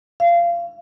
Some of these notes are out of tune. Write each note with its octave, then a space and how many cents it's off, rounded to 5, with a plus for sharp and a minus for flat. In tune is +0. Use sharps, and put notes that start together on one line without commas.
F5 -25